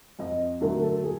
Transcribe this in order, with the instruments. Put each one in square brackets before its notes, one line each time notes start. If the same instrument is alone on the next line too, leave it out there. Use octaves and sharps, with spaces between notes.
[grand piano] F2 [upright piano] D#5
[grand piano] D3 F#3 A3 [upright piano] A#4
[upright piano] A4
G#4